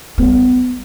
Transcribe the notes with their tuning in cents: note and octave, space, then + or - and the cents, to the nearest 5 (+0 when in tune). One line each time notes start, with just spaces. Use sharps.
G3 +0 B3 +25